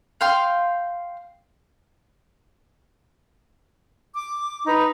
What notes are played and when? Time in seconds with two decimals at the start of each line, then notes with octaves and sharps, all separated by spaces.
0.21 F5 G5 C6 F6
4.15 D6
4.64 D#4 B4